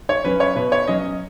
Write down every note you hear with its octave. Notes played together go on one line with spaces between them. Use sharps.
C#5
F#3 C#4 B4
C#5
B2 B4
C#5
F#3 C#4 D#5